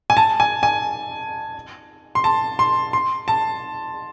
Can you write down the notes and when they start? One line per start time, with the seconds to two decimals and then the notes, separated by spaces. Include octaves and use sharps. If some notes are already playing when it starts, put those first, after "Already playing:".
0.10 G#5
0.17 A5
0.40 G#5
0.63 G#5
2.15 C6
2.24 A5
2.59 C6
2.93 C6
3.28 A5